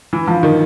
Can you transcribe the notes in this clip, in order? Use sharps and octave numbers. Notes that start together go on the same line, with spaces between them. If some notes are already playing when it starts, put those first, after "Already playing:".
E3
F3
D#3